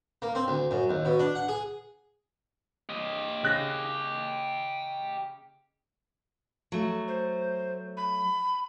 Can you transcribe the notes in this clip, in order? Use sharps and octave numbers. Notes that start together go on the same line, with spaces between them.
A#3
C4
D2
F#2
D#2
B2
D4
F#5
G#4
G4 D#5
C#3 F#6 A#6
F#3 A3
C5
B5